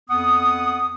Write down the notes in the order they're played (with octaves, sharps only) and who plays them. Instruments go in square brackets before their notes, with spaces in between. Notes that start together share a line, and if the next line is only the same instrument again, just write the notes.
[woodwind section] F2 B3 F#5 D#6